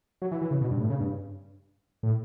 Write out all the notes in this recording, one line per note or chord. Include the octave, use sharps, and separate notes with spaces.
F#3
E3
E3
C#3
B2
G2
A2
C#3
G2
A2